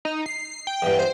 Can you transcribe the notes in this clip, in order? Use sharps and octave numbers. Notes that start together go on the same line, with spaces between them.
D#4
C7
G5
E2 G2
C5